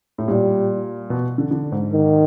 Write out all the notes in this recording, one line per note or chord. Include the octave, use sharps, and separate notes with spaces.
A2
A#2 G3
B2
D3
D3
G#2
D#3